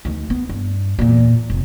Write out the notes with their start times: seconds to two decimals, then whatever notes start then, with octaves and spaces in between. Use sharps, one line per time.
0.05 D2 D#3
0.30 B3
0.49 G2
0.99 E2 A#2
1.50 F1